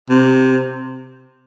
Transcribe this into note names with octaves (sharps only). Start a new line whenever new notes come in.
C3